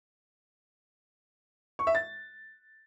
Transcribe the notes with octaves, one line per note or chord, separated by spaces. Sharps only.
C#6
E5
A6